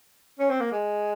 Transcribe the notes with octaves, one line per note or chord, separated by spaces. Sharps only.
C#4
C4
A#3
G#3